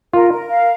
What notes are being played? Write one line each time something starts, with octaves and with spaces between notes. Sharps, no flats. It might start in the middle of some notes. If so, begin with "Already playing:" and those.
F4 A#4
A#4
F5